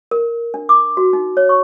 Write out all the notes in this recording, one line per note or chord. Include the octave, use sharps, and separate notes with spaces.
A#4
D4
D6
F#4
D#4
C#5
C#6